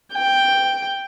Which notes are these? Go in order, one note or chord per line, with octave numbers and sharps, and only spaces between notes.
G5